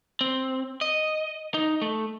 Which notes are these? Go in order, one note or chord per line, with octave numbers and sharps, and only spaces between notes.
C4
D#5
D#4
A3